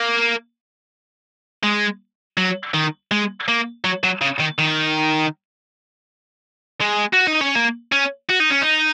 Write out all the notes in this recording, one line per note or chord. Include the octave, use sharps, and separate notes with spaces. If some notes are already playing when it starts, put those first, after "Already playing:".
Already playing: A#3
G#3
F#3
D#3
G#3
A#3
F#3
F#3
C#3
D#3
D#3
G#3
F#4
D#4
C#4
A#3
C#4
F#4
D#4
C#4
D#4